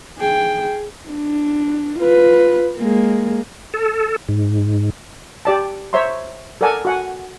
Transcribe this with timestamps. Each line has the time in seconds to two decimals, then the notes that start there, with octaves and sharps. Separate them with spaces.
0.18 G#4 G5
1.09 D4
1.99 F4 B4
2.78 G#3 A#3
3.74 A4
4.29 G#2
5.45 G4 D5 A5
5.93 C5 C#5 E5 A#5 C6
6.61 A4 A#4 D5 F#5 G#5 A5
6.85 F#4 F#5 G#5